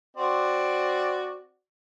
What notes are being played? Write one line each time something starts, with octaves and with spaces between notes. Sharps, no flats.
C4 F#4 D5